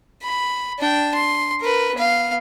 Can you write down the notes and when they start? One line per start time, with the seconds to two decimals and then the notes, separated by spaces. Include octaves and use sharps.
0.23 B5
0.79 D4 G5
1.14 C6
1.61 A#4 B4
1.95 B3 F5